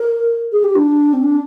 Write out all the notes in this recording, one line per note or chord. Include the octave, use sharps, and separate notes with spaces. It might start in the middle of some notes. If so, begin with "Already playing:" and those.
Already playing: A#4
G#4
G4
D4
C4
D4